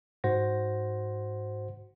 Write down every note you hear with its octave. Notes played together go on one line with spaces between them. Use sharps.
G#2 F#4 C5 F#5 A#6